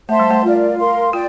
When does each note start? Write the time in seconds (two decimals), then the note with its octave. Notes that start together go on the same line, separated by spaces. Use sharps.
0.08 A3 C5 E5 A5 C6
0.19 G3
0.31 A3
0.44 F4 A#4 D5
0.78 A#4 F5 C6
1.13 F4 D5 G5